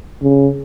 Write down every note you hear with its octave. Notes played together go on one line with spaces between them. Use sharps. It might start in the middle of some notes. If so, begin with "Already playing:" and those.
C#3